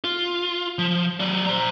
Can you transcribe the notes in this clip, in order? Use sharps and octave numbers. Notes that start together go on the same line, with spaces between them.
F4
F3
F#3 D5
C5 A#5